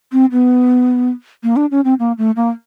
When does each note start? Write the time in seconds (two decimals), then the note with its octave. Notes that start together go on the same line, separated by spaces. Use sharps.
0.12 C4
0.32 B3
1.43 A#3
1.56 D4
1.71 C#4
1.84 C4
1.99 A#3
2.18 A3
2.36 A#3